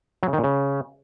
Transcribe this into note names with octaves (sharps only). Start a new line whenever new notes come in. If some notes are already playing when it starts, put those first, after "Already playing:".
F#3
C#3
D#3
A#2
C#3